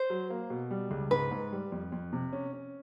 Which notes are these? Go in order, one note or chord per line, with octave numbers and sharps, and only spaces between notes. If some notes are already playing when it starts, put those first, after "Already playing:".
Already playing: C5
F#3
A#3
B2
G3
C#2
G#2 B4
G#2
G3
F2
F2
C3
C#4
C#4